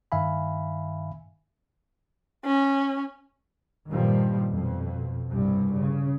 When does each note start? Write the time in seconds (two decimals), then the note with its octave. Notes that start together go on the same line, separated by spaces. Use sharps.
0.12 G2 D#3 E5 F5 G#5 B5
2.45 C#4
3.90 G2 A#2 D#3 F3 G3
4.52 F2 B2
5.33 C2 G2 C3 G3
5.76 C#3